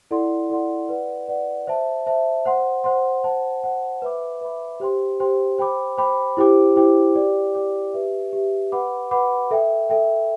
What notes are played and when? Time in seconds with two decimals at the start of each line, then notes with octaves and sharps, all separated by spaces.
0.11 E4 A4 D5 F#5 C6
0.50 E4 A4 D5 F#5 C6
0.89 B4 D5 F#5
1.28 B4 D5 F#5
1.67 C5 E5 A5
2.06 C5 E5 A5
2.46 C5 F#5 C6
2.84 C5 F#5 C6
3.24 C5 F#5 A5
3.63 C5 F#5 A5
4.02 B4 E5 B5 D6
4.41 B4 E5 B5 D6
4.80 G4 C5 G5 C6
5.20 G4 C5 G5 C6
5.58 C5 G5 B5 D6
5.98 C5 G5 B5 D6
6.37 E4 G4 C5 G5 D6
6.76 E4 G4 C5 G5 D6
7.15 G4 D5 G5 D6
7.55 G4 D5 G5 D6
7.93 G4 B4 E5
8.33 G4 B4 E5
8.72 B4 F#5 B5 D6
9.11 B4 F#5 B5 D6
9.51 A4 E5 G5
9.89 A4 E5 G5